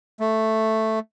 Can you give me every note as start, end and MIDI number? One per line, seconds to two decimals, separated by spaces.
0.20 0.99 57